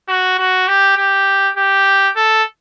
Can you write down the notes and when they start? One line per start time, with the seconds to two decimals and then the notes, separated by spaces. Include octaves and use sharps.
0.08 F#4
0.39 F#4
0.68 G4
0.97 G4
1.57 G4
2.16 A4